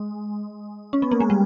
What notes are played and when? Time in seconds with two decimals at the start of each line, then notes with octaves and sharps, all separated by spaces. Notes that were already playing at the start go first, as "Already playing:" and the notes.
Already playing: G#3
0.93 C#4
1.02 B3
1.11 A#3
1.20 G#3
1.30 G3